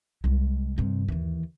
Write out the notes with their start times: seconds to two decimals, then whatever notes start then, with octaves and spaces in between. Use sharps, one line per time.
0.24 C2 G#3
0.78 G2 C3
1.08 D#2 E3